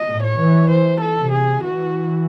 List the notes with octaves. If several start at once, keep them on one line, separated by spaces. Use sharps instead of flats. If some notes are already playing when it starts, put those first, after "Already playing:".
Already playing: D#5
A2
C#5
E3
C5
A4
C3
G#4
E3 F#4